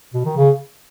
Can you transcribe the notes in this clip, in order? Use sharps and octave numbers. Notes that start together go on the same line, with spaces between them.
B2
D#3
C#3